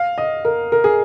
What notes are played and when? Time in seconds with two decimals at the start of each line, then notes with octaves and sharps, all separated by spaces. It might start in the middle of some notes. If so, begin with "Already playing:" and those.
Already playing: F5
0.18 D#5
0.45 A#4
0.72 A#4
0.84 G#4